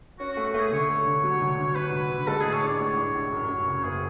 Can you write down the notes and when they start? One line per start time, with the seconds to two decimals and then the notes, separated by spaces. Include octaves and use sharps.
0.19 C#4 F#4
0.33 F#4
0.37 A3
0.45 F#4
0.54 A3 G#4
0.71 D3 C#5
0.89 A3
1.06 D3
1.23 F#3
1.41 D2
1.58 D3
1.75 F#3 B4
1.92 D2
2.10 D3
2.27 G#3 A4
2.41 A2 G#4
2.53 C#5
2.62 D4 D5
2.79 A2 C#5
2.97 D4
3.14 A2
3.32 F#2
3.49 F#2
3.66 C#3
3.83 F#1 G#4